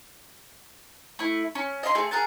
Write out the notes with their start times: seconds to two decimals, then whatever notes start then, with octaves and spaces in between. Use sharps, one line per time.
1.19 A3 E4
1.55 C#4
1.83 D#5 F5 B5 C6
1.95 A3 C4 G#4
2.11 G#4 A#4 F#5 A5